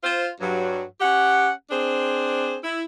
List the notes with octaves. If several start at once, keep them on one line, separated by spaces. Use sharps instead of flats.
F4 C5
G2 F#3
C#4 G4 F#5
C4 D4 G#4 C5
E4